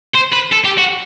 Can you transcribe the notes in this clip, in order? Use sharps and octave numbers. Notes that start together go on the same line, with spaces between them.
C5
B4
A4
G4
F#4